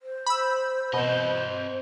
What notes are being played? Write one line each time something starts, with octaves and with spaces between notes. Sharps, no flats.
C5
B5 E6
B2 C4 D#5